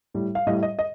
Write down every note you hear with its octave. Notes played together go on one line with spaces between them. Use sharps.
A2 G3
F5
A2 G3 D#5
D#5
D#5